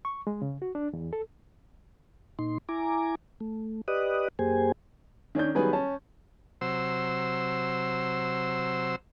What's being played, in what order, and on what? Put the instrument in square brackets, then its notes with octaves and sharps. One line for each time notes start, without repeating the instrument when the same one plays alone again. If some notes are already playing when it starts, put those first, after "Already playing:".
[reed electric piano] C#6
G#3
C#3
F#4
D4
E2
A4
[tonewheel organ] A#2 D#4 C6
E4 G#5 A#5 D6
A3
G4 B4 D5 D#5 D#6 F#6
F#2 A#3 G4 G#4 C5 G#5
[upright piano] D#3 C#4 D4 G6
D#3 F#3 G3 B3 G#4 B4
C#4 A5
[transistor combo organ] C3 F#3 C5 E6